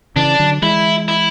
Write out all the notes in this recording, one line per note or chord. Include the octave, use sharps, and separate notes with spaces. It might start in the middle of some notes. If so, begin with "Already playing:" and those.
C#3 E3 D4
D3 F#3
E3 G#3 E4
E4